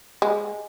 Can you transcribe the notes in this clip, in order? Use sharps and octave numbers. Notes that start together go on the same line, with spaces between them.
G#3